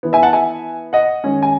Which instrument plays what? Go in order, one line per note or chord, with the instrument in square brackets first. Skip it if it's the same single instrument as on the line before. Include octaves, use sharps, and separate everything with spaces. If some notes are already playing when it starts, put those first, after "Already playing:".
[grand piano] E3 B3
E5 G#5
F#5 A5
E5 G#5
D#5 F#5
D#3 G#3 C#4
G#5